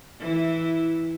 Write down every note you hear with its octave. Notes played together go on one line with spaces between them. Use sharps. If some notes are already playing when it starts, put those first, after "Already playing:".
E3 E4